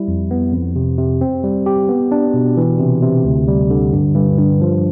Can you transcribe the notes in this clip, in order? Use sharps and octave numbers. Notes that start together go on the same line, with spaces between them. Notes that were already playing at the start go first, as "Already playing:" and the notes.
Already playing: G3 E4
F2
B3
F2
C3
C3
C4
G3
G4
B3
D4
B2
E3
C3
C3
D2
G3
D3
G2
G2
G2
F3